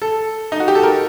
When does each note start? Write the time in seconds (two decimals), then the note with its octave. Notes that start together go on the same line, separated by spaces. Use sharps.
0.02 A4
0.52 D#4
0.60 F#4
0.68 G4
0.75 A4
0.83 A#4